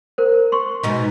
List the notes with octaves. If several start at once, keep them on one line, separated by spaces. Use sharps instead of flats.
A#4 C5
C6 C#6
G#2 B2 D#4